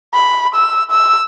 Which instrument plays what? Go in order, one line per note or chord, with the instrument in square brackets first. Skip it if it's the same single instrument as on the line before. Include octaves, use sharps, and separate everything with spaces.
[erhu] B5
E6
E6